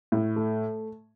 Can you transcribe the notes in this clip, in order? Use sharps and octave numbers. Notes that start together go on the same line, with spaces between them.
A2
A3